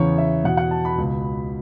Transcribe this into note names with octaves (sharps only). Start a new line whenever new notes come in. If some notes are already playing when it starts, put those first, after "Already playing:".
Already playing: E2 C#3 E3 C#5
E5
E2 B2 F#5
F#5
A5
B5
C#2 B2